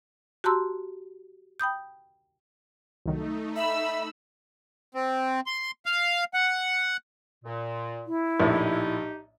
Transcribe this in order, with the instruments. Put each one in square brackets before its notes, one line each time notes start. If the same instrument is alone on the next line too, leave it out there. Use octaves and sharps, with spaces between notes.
[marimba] F#4 G4 A5 A#5 C6 E6
G5 B5 D#6 G6
[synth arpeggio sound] C2 D#3 F#3 [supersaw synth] A3 D#4
[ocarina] E5 [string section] B5 E6
[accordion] C4
C6
F5
F#5
[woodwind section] A#2
[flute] E4
[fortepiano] A#1 A2 [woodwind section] D#4 G4